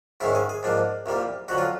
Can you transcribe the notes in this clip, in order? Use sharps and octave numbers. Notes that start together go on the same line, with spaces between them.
G#2 D#3 G#3 C#4 E4
G#4
G#4
G#2 F3 A#3 D4
C2 A#2 G3 A#3
F2 D3 F#3 F#4
F4